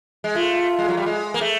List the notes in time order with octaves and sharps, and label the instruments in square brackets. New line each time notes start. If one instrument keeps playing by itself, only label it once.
[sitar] G#3
[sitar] A3 [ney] F4
[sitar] G#3
F#3
G3
G#3
A#3
A3